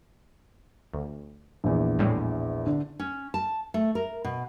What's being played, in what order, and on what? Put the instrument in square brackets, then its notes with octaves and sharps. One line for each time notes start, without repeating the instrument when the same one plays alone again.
[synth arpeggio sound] D2
[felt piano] A#1 E2
[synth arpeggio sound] A2 G3 G#3
[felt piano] D3
[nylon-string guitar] C#4
A5
A3
A#4
B2